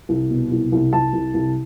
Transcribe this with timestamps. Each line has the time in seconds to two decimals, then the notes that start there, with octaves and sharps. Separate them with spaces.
0.09 C2
0.30 B2
0.51 C2
0.72 C2
0.93 C2 A5
1.13 C2
1.34 C2